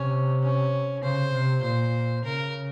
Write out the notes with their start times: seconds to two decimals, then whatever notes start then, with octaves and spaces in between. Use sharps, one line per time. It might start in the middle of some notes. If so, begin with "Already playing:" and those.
Already playing: C3 C#4
0.43 C#4
1.03 C#3 C5
1.33 C3
1.63 A#2 C5
2.24 C#3 A#4